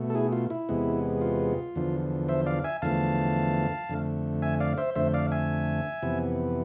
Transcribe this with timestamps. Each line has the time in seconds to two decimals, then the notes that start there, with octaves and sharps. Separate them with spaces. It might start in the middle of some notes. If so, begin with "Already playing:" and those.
Already playing: B2 A3
0.10 A4
0.15 E4 G#4
0.33 F4
0.50 E4
0.69 E2 C3 G#3 B3
1.22 F4
1.75 E2 D3 F3
2.28 C5 E5
2.46 D5 F5
2.64 E5 G#5
2.82 E2 D3 F3 A3 F5 A5
3.89 F2 D3 A3
4.42 E5 G#5
4.60 D5 F5
4.78 C5 E5
4.95 F2 D3 A3 C5 E5
5.14 D5 F5
5.32 E5 G#5
6.02 F2 C3 E3 B3